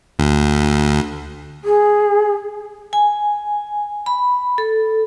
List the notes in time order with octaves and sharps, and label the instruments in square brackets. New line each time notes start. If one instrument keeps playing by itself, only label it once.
[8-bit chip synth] D2
[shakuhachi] G#4
[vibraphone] G#5
B5
A4